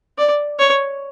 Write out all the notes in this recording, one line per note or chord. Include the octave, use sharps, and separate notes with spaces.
D5
C#5